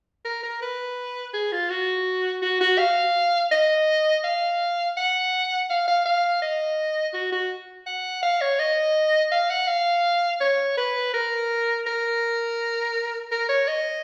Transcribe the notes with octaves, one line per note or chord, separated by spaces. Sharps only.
A#4
A#4
B4
G#4
F4
F#4
F#4
F#4
F5
D#5
F5
F#5
F5
F5
F5
D#5
F#4
F#4
F#5
F5
C#5
D#5
F5
F#5
F5
C#5
B4
A#4
A#4
A#4
C#5
D#5